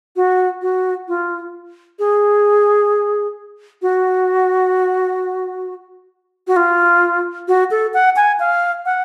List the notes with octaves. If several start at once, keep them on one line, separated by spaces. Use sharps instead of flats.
F#4
F#4
F4
G#4
F#4
F#4
F4
F#4
A4
F#5
G#5
F5
F#5